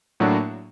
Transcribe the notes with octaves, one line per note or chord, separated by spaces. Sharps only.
A2 F#3 A#3 D4 F#4